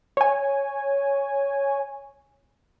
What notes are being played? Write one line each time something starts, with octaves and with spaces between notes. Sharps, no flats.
C#5 G#5